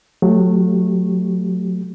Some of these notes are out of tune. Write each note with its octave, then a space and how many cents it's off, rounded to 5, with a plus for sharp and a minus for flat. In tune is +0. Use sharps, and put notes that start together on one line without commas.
F#3 -25 A3 +0 G4 -10